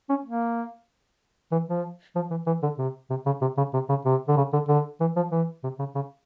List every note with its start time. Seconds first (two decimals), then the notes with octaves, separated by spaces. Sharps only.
0.09 C#4
0.25 A#3
1.52 E3
1.68 F3
2.15 F3
2.30 E3
2.47 E3
2.63 D3
2.78 C3
3.10 C3
3.26 C#3
3.41 C3
3.57 C#3
3.74 C3
3.89 C#3
4.05 C3
4.28 D3
4.37 C#3
4.53 D3
4.68 D3
5.00 E3
5.16 F3
5.32 E3
5.63 C3
5.79 C#3
5.95 C#3